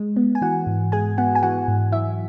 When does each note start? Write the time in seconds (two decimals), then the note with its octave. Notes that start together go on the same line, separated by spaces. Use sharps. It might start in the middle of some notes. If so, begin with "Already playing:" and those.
Already playing: G#3
0.16 B3
0.35 G#5
0.41 E3 F#4 F#5
0.67 G#2
0.92 G#3 G#4 G#5
1.17 B3 F#4 F#5
1.35 G#5
1.42 E3 F#4 F#5
1.68 G#2
1.92 F#3 E4 E5